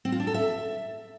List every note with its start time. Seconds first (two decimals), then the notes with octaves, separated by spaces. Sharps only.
0.05 C4
0.12 F4
0.20 D4
0.27 A4
0.34 E5